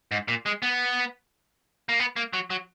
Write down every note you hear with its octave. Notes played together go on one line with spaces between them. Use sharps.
G#2
A#2
G#3
B3
A#3
B3
A#3
F#3
F#3